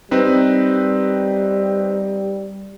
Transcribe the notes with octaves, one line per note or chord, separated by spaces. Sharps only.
G3 C4 D#4 B4